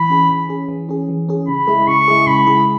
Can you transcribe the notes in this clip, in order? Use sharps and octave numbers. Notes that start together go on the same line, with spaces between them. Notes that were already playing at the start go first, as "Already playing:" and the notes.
Already playing: E3 B5
C#4 G#4
E3
C#4 G#4
E3
C#4 G#4
E3
C#4 G#4
C#3 B5
G#3 E4 G#4
C#3 C#6
G#3 E4 G#4
C#3 B5
G#3 E4 G#4